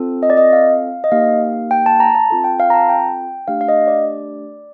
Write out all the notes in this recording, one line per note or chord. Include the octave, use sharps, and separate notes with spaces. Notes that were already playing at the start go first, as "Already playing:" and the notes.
Already playing: C4 F4 A4
D#5
D5
D#5
F5
D#5
A#3 D#4 G4 F5
G5
A5
A#5
A5
C4 F4 A4
G5
F5
A#5
A5
G5
A3 D4 G4 F5
F5
D#5
D5